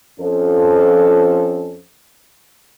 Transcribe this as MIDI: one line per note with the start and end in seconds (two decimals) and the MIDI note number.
0.20 1.82 41
0.20 1.82 53
0.20 1.82 61
0.20 1.82 69